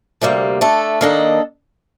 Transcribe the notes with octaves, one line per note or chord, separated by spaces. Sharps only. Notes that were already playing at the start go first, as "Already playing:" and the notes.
D2 C3 G3 A#3
A3 D4 A4
D#3 A#3 D4 A4 D#5